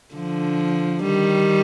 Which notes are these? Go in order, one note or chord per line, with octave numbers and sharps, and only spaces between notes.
D3 F3
D#3 G3